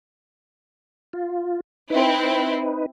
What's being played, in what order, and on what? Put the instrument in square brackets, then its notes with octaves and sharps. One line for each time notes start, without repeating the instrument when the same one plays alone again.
[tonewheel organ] F4
[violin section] C4 E4 [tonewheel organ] D#4 B4